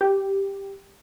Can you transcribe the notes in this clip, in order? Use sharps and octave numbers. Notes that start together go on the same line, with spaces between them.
G4